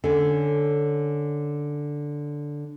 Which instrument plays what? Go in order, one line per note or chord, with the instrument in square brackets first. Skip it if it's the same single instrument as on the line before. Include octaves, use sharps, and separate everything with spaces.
[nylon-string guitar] D3 C#4